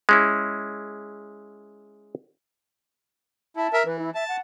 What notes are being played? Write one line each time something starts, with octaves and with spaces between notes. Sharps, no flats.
G#3 C#4 E4
E4 A5
A#4 E5
E3 B4
E4
E5 A5
F#5